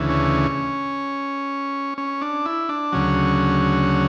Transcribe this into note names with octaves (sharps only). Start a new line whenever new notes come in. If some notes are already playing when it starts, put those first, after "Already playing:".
Already playing: D2 C#3 E3
C#4
C#4
D4
E4
D4
D2 C#3 F#3 C#4